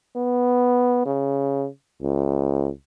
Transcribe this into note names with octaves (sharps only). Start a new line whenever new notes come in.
B3
C#3
C#2